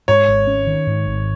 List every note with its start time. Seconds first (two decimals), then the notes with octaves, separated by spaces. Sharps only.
0.08 G#2 C#5
0.28 G#1
0.47 C#4
0.67 D#3
0.87 G#2
1.06 G#1